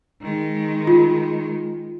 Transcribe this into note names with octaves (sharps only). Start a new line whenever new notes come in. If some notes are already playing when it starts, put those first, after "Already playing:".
D#3 G#3
F4